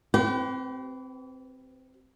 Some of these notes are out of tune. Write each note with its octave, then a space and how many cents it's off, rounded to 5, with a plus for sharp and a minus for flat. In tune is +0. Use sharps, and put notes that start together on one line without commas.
C4 -5 G4 -40 B4 +15